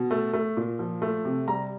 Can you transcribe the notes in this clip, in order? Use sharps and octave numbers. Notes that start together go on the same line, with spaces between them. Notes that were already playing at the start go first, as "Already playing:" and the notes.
Already playing: B2
A3
A3
A#2
F3
A3
C3
G3 A#5